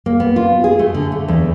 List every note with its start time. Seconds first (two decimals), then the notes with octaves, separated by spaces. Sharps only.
0.06 A#3
0.20 B3
0.36 F4
0.64 G#4
0.79 A3
0.94 D3
1.12 A3
1.28 E2